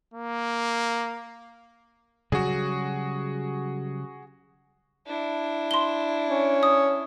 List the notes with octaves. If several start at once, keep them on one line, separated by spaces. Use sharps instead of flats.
A#3
C#3 F#3 G3 F#4 G#4
D4 E4
C6 G7
C#4
D#6